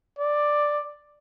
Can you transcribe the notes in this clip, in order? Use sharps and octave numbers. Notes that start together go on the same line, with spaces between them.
D5